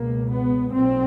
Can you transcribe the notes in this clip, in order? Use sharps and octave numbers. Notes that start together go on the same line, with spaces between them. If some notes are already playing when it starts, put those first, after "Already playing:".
Already playing: C#2 B2 A#3
B3
B1 A#2 C4